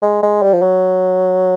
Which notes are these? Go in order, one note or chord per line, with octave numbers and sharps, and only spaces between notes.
G#3
G#3
G3
F3
F#3